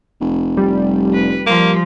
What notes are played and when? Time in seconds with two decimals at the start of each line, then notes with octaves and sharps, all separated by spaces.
0.20 F1
0.57 G3
1.13 B4
1.46 F3 A#3